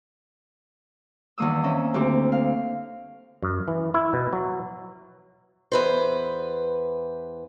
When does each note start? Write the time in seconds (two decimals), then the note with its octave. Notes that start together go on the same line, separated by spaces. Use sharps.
1.38 E2 G2 D#3 A#3 D#6 E6
1.64 C4 C#4 D#5 E5
1.94 D2 C4 G4
2.32 F5
3.42 F#2
3.68 E3
3.94 E4
4.13 B2
4.33 F#3
5.72 E2 B4 C5